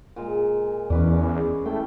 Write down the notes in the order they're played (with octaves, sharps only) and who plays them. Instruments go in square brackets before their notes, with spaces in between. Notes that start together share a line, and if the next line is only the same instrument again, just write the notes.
[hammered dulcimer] A#2 G#3
[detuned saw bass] E2 [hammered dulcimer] C#4 B4 D5
[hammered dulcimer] G#4
[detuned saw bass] A3 [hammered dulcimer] E4 G5